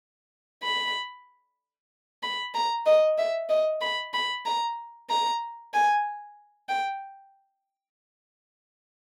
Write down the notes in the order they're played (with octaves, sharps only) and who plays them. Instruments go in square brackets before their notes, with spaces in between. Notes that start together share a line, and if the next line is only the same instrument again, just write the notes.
[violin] B5
B5
A#5
D#5
E5
D#5
B5
B5
A#5
A#5
G#5
G5